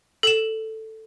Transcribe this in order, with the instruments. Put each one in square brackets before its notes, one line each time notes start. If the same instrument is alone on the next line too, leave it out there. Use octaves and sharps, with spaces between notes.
[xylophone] A4 E7